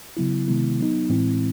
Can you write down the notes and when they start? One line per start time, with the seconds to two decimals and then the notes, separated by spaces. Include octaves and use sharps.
0.17 C#3 F#3 B3 E4
0.48 C3 D#3 G#3 B3 E4
0.79 F#3 B3 D#4
1.09 A2 E3 G#3 C4 E4